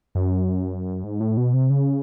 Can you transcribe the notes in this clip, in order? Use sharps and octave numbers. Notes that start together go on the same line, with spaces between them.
F#2
G#2
A2
B2
C3
C#3